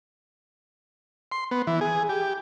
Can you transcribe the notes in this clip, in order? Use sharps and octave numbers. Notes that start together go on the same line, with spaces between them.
C6
B3
E3
G#4
G4